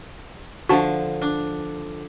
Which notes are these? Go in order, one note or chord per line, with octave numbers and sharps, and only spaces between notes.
D3 F3 F#4 A5
D4